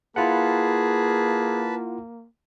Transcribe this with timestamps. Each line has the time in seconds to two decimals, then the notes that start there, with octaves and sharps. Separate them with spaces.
0.16 A#3 E4 F4 G#4 B4 F#5 A5